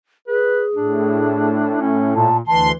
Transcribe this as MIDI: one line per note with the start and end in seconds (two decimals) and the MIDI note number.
0.28 1.50 68
0.28 0.64 71
0.75 2.29 45
0.75 1.80 62
1.81 2.13 61
2.15 2.40 46
2.15 2.37 81
2.47 2.72 38
2.47 2.74 52
2.47 2.69 81
2.47 2.72 84